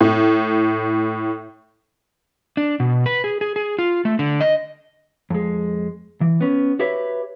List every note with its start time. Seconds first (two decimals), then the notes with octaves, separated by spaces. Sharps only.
0.01 A2
2.57 D4
2.80 B2
3.06 B4
3.24 G#4
3.41 G#4
3.56 G#4
3.79 F4
4.05 A3
4.19 D3
4.41 D#5
5.30 F2 G#3
6.21 E3
6.41 B3 C#4
6.79 F#4 G4 B4 C#5 E5